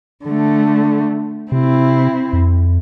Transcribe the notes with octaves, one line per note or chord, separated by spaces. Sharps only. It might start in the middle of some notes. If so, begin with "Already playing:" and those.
D3 A3
C3 C4 E4
F2